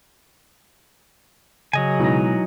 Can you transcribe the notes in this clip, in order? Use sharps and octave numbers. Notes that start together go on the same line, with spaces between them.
C#3 F#3 D#5 G#5
B2 E3 G#3 D#4 A#6